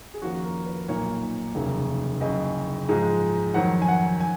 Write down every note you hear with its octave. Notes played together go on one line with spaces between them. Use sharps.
G#4
F2 D#3 A#3 C#4 F4 F#4
A#4
B4
B1 A#2 F#3 A#3 D#4 C#5
F1 D#2 C#3 F#3 A#3
F#1 F#2 C#3 D#5
G#2 F3 G#3 D#4
F2 D#3 F#3 F#5
G#5
F#5
G#5